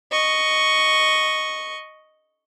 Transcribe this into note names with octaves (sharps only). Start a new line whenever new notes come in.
D#5 C#6